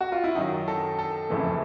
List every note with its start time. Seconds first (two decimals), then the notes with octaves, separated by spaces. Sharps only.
0.01 F#4
0.12 F4
0.24 E4
0.35 F#2 D#3 F#3 D#4
0.68 A4
0.99 A4
1.29 F#1 F2 C#3 E3 A3